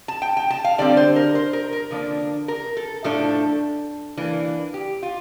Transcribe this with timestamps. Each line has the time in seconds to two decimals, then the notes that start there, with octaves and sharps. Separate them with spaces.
0.08 A5
0.22 G5
0.37 G5
0.50 A5
0.64 F5
0.78 D3 G3 C4 D5
0.97 C5
1.16 A#4
1.35 C5
1.53 A#4
1.72 A#4
1.91 D3 F3 A#3 D4
2.48 A#4
2.77 A4
3.04 A2 F3 A3 D4 A4
4.17 E3 A#3 D4
4.74 G4
5.03 F4